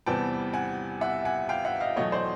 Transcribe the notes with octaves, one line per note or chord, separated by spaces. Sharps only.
E2 C3 E3 G3 B3 G5 A5
F#5 G#5
E5 F#5
F#5 G#5
F5 G5
E5 F#5
D#5 F5
E2 B2 F#3 A3 C#5 D#5
C5 D5